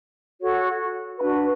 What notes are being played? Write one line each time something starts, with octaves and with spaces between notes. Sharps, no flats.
F#4 A4 C#5
D4 F#4 B4 B5